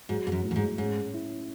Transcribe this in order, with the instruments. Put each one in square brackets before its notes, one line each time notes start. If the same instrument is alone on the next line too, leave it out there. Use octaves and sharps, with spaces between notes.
[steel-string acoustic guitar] G#2 [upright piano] F#3
[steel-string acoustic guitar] G#2
F#2
[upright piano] A2
[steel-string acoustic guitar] F#2
G#2
[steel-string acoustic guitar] G#2 [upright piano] C#4
[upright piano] E4